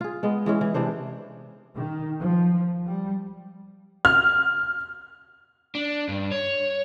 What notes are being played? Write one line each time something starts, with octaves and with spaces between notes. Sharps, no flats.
F4 G#4
G#3 B3 D#5
E3 G#3 C#4
E3
C3 E3 D4 C5
D#3
F3
G3
F6
D4
G2
C#5